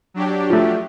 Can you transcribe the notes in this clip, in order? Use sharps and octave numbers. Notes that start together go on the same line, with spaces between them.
F#3 D4 G4
F3 A3